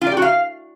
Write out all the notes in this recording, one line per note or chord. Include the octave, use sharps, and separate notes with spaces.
F4
D5
G4
F#4
F5